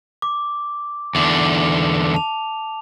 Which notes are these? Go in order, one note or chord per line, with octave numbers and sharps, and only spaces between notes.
D6
E2 D3 D6
A5 F7